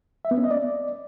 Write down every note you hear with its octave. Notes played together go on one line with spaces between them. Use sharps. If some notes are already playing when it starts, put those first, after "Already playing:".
E5
B3
C#4
D#5
D5